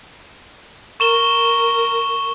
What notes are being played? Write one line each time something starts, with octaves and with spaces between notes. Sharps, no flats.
A#4 C#6 E7 G7